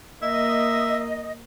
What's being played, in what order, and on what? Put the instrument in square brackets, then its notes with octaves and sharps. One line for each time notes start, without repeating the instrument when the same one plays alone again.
[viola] A#3 [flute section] D#5 [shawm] E5